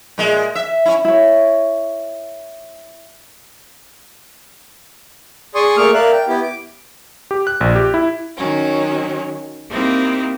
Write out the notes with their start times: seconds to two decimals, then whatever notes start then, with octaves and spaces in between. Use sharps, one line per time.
0.18 A#2 G#3
0.55 E5
0.85 C#4 E4
1.05 E4 C#5
5.55 G#4 D5 G#5 C6 C#6 D#6
5.77 A3 A#3 G#4 C#6 D6 F6
5.94 A#4 D5 E5 F5 F#6
6.12 G5
6.28 B3 E4 G4
6.42 D6
7.31 G4
7.47 F#6
7.61 A#1
7.75 G4
7.94 E4
8.37 D#3 F#3 C#4
9.70 A#3 C4 D#4 E4 G4